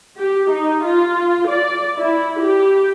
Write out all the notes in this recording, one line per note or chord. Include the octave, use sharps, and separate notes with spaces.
G4
D#4
F4
D5
E4
G4